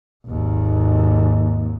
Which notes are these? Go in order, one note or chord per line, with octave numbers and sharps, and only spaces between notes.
G#1 D#2